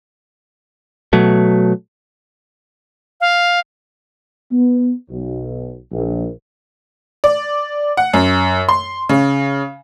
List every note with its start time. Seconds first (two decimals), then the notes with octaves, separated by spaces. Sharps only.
1.13 B2 F#3 A3
3.21 F5
4.51 B3
5.09 B1
5.92 A#1
7.24 D5
7.97 F#5
8.13 F#2
8.69 C6
9.09 C#3